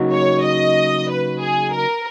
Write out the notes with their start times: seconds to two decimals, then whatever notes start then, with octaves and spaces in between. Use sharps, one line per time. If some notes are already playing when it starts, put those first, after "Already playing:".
Already playing: C#3 F#3 A#3 D#4 F#4
0.12 C#5
0.44 D#5
1.09 B4
1.40 G#4
1.72 A#4